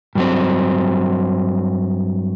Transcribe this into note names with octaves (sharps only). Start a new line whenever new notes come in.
G2 F#3 C4